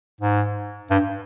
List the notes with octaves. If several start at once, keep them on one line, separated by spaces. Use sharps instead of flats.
G#2
G2